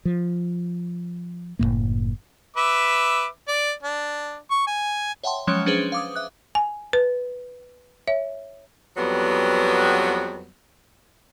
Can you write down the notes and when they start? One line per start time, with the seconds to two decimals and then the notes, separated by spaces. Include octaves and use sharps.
0.05 F3
1.59 F#1 E2 A2 A#3
2.56 B4 E5 D6
3.48 D5
3.83 D4
4.51 C#6
4.67 G#5
5.24 C#5 E5 F#5 G5 A5 C6
5.47 F3 F#3 G#3 C#4 C#5
5.66 C#4 D4 G#4 B4 C5
5.92 F5 D6 D#6
6.15 E5 F#6
6.55 G#5
6.93 B4
8.08 C#5 E5
8.97 F2 F#3 G3 B3